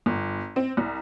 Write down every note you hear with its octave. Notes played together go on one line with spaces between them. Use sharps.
G1
C4
C2